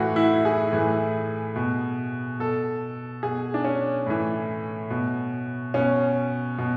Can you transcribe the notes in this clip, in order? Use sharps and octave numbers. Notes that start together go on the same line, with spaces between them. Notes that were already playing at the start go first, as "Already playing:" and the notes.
Already playing: A2 E3 F#4
E4
G#4
A2 E3
B2
B2 A4
B2 G#4
D4
C#4
A2 E3
B2
B2 C#4
B2